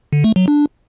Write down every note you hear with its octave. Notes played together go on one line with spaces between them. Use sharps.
D3
A3
F#3
D4